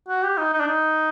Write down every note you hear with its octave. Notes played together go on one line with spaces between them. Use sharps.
F#4
G4
D#4
D#4
D4
D#4